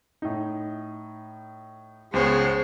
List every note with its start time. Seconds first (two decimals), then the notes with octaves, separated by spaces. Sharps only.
0.22 A2 D#4
2.14 C#2 G#3 B3 C5 C#5